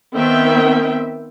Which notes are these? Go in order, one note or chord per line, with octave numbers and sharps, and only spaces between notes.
D#3 B3 C4 E5 G5